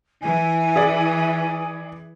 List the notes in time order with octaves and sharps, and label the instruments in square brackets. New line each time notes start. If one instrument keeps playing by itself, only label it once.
[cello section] E3 [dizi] G#5
[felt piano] G#4 D5